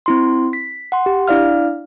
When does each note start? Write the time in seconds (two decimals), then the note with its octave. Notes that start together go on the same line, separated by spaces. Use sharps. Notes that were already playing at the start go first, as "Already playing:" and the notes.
0.06 C4 E4 C6
0.53 B6
0.92 F#5 C6
1.06 G4
1.28 D4 E4 D5 F5 F6